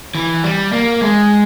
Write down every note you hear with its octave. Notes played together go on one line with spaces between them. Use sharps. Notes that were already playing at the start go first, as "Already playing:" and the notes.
E3
G3
A#3
G#3